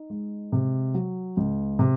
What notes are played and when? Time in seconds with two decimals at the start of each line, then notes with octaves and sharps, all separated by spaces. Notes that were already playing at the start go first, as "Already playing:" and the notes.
Already playing: D#4
0.10 G#3
0.52 C3
0.94 F#3
1.37 C#2
1.79 C3